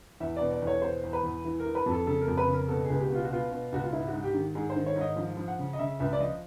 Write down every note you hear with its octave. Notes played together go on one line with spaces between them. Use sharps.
E2 E5
B2 D5
D5
E2 C#5
B2 C5
E2
B4
E2
E3
A#4
E3
B4
F2 A4
C#3 A4
A#4
F2
B4
C#3
A#4
B2 A4
G#4
C#2
G4
B2
F4
F#4
B2 F4
B2
C#2 F#4
F4
G#2 E4
G#2 F#4
G4
D#3
G#2 G#4
C5
D#3
C#5
G#2
D#5
F3
F3
F#5
C#3
D#5
C#3 E5
C#2 E5
D5
F3 D#5